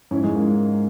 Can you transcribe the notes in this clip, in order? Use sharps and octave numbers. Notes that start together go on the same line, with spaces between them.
G#2 C#4 E4
G#3
A#3